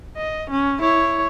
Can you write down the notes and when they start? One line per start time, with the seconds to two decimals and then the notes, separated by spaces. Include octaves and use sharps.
0.16 D#5
0.50 C#4
0.81 E4 C#5